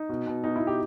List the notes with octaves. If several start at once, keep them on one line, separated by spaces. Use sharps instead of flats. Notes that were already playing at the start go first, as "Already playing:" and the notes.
Already playing: D#4
B2
B2
B2 D#4
E4
B2
G4